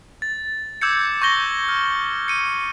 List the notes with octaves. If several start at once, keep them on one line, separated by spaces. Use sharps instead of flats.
A6
D6 E6 G6 G#6 C#7
C#6 G6 A#6 G7
F6
C#7 D#7